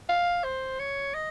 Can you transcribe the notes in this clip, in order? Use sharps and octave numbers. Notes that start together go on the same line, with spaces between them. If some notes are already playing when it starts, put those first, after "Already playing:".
F5
C5
C#5
D#5